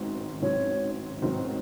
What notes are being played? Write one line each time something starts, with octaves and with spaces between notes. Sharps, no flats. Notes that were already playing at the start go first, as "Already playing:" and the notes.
Already playing: A1 G#2 D#3 F#3 C4
A1 G#2 D#3 F#3 C4 C#5
A1 G#2 D#3 F#3 C4